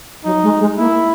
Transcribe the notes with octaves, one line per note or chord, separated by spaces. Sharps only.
F#3 D#4
G#3
G#3
A#3 E4